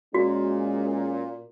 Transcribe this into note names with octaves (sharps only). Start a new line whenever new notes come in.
A#2 G#3 C#4 F#4